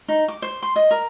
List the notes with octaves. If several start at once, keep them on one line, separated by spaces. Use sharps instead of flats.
D#4
D6
C5
C6
D#5
A#4